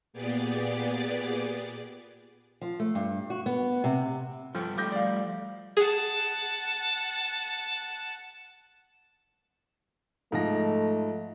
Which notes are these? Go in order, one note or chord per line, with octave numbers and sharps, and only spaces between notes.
A#2 B3 G4 G#4 D5 A6
F3
A3
G2
F#4
B3
C3
G2 F3 A4 G5
G3 A3 G4 D6 G6 A#6
D5 F5
G#4 F#5 A5
G#2 F3 A3 A#6